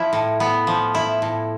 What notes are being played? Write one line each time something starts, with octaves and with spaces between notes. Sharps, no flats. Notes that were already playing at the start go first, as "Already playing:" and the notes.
Already playing: F3 E4
A2
B3
F3
E4
A2